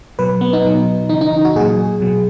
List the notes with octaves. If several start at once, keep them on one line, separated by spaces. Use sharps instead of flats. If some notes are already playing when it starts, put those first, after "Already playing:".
B2 F#3 B4
B3
D#4
B2 F#3
C#3 E3 D#4
D#4
F#4
A#2 F#3 G#4
B2 F#3